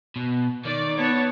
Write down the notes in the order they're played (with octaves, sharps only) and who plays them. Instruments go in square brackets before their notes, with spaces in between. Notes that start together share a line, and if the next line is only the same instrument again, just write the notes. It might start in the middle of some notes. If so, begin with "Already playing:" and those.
[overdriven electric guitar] B2
[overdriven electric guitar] D#3 [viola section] D5
[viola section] B3 C#5 A5